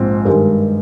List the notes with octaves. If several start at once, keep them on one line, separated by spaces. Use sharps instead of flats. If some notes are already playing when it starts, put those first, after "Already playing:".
Already playing: A#1 G#2 C4 F4
G2 D#3 G#3